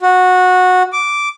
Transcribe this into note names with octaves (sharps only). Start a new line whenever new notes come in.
F#4
D6